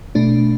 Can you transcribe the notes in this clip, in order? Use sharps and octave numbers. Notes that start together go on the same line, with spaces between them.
B2 A3 D4